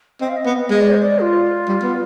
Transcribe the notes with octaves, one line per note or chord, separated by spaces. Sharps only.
C4 D#5
F5
D#5
B3
G#3 D#5
D5
C5
D5
F4
G3
B3